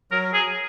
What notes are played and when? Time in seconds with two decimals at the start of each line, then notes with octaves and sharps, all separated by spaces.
0.11 F#3 A#4
0.34 G#4